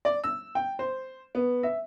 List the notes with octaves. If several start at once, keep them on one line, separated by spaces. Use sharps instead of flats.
D5
E6
G5
C5
B3
E5